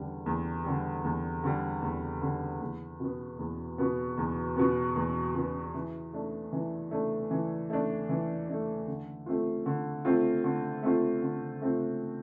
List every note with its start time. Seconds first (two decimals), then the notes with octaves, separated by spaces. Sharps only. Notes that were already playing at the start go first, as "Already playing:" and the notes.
Already playing: E2 D3 G3
0.26 E2
0.65 D3 G3
1.04 E2
1.44 D3 G3
1.82 E2
2.22 D3 G3
2.61 E2
3.00 B2 B3
3.39 E2
3.78 B2 B3
4.18 E2
4.56 B2 B3
4.96 E2
5.35 B2 B3
5.75 E3
6.13 A3 D4
6.53 E3
6.91 A3 D4
7.31 E3
7.70 A3 D4
8.09 E3
8.49 A3 D4
8.87 D3
9.26 A3 C4 F4
9.66 D3
10.05 A3 C4 F4
10.44 D3
10.83 A3 C4 F4
11.22 D3
11.62 A3 C4 F4